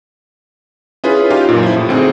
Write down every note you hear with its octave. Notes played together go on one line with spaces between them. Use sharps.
C#4 E4 F4 G#4 B4
D#4 F4 G4 F5
F#2 A#2
F3 E4
A2
D2 C4 D#4 G#4